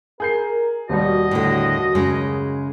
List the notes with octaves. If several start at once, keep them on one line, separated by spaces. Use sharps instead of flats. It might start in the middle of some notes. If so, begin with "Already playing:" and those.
G#4 A#4 G6 C7
D#2 B2 G3 F#4 D#5
A2 D3
F#2 C#3 G#3